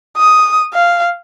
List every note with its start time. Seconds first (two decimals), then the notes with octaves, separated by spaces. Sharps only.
0.17 D#6
0.74 F5